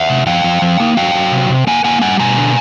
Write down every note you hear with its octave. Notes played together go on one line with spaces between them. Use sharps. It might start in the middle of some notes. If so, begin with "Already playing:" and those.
Already playing: E5 F#5
C3
F3 F5 G5
F3
F3
A#3
F#3 F5 G5
F#3
C3
C3
A#3 F#5 G#5
A#3 F#5 G#5
G3 F#5 G#5
B2 G#5 A#5
D3